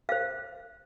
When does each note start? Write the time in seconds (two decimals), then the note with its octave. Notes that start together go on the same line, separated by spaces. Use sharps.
0.09 C5 F5